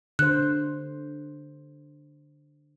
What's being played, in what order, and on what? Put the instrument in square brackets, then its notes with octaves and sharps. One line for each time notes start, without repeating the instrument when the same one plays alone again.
[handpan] D3 C5 [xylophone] F#6